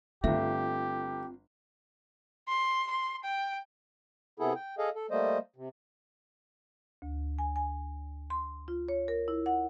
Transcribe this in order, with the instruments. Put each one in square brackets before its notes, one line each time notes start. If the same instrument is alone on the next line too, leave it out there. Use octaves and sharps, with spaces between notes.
[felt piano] G1 A3 [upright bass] C4 F4 [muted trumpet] G4 [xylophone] E5
[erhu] C6
C6
G5
[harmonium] C3 B3 E4 G#4 A4
G5
G#4 A4 D#5 F5
A4
G3 A3 A#3 C5 D#5
C3
[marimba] D2
G#5
G#5
C6
F4
C#5
A#4
E4
F#5